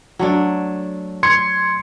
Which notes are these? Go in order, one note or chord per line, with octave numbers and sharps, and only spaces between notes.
F#3 A3 D4
C6 G#6 C#7